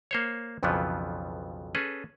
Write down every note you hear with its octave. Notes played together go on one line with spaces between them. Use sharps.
A#3 C5 C#5
B1 F2 C#3 E3 F3 B3
C#4 G#4 A4 B4